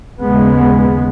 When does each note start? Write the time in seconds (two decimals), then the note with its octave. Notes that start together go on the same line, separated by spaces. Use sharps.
0.21 D#2 C#3 G#3 B3